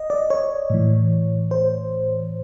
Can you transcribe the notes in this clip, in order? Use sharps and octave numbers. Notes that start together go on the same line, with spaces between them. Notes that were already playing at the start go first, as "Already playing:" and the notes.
Already playing: D#5
D5
C#5
A2 E3
C5